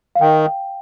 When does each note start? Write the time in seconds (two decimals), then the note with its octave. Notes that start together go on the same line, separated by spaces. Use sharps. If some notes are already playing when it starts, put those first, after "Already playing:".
0.15 F5
0.20 D#3 G5